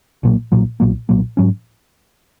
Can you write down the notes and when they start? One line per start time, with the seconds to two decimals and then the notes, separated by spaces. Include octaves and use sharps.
0.23 B1 A#2 F#3 A#3
0.52 B1 A#2 F#3 A#3
0.80 B1 A#2 F#3 A#3
1.09 B1 A#2 F#3 A#3
1.37 G#2 F#3 C#4